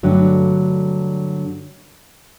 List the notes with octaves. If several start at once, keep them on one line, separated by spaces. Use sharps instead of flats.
G2 D3 F#3 A3